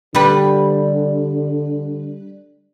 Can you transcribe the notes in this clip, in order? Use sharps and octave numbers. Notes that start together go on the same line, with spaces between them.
D3 G3 B4